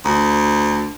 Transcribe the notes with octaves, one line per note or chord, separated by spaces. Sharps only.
D2